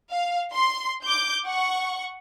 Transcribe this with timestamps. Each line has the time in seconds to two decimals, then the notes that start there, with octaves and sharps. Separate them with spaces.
0.12 F5
0.54 C6
1.03 D6 G6
1.47 F#5 C#6